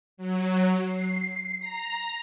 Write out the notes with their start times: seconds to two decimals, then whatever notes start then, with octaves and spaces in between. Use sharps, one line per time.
0.17 F#3
0.84 C7
1.60 A#5